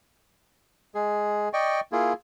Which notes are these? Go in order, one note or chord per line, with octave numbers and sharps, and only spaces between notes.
G#3 G#4
D5 D#5 G5 C#6
A#3 E4 F4 G#4